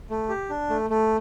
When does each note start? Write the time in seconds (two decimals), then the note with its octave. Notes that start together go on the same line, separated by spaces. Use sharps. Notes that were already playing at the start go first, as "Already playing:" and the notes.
0.10 A3
0.29 G4
0.50 D4
0.70 A3
0.90 A3